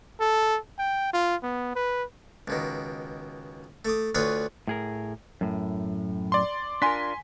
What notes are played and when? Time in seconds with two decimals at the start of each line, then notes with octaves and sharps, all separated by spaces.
0.20 A4
0.78 G5
1.14 F4
1.43 B3
1.76 B4
2.48 C#2 B2 D#3
3.85 A3 D6 D#6
4.15 D2 F4 B4 C#5 F5 D#6
4.67 A2 G#4 A#4
5.41 F#2 A2
6.32 D5 C6
6.82 D4 F4 A#4 G#5 C6 B6